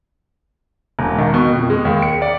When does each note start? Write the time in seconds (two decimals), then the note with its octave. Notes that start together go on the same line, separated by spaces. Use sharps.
0.99 E1
1.18 D#3
1.34 B2
1.55 F2
1.70 G#3
1.85 D#2
2.02 C#7
2.22 D5